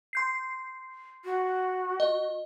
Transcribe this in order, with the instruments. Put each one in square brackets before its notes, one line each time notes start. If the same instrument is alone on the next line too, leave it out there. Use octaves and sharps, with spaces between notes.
[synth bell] C6 G6 C7
[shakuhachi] F#4
[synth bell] D#5